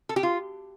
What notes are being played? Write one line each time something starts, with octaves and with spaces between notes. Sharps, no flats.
A4
G4
F4